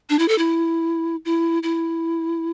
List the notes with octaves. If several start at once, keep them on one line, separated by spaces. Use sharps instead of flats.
D4
E4
A4
E4
E4
E4